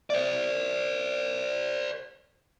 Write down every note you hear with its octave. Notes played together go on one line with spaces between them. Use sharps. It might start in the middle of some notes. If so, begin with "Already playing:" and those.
C5 D5